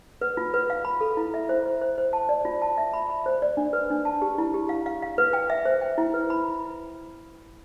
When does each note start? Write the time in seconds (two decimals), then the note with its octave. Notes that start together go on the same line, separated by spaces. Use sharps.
0.21 B4
0.37 F4
0.54 B4
0.70 F5
0.85 B5
1.01 A4
1.17 E4
1.34 E5
1.49 C5
1.66 C5
1.81 C5
1.98 C5
2.13 A5
2.29 D5
2.45 F4
2.62 A5
2.78 E5
2.94 B5
3.09 B5
3.26 C5
3.42 D5
3.57 D4
3.73 B4
3.90 D4
4.05 A5
4.22 G4
4.38 E4
4.54 G4
4.69 F5
4.86 F5
5.02 F5
5.18 B4
5.33 G5
5.50 E5
5.65 C5
5.81 G5
5.98 E4
6.14 B4
6.30 B5